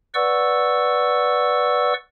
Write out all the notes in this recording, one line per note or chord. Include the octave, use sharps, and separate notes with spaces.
B4 D5 F#5 C#6 E6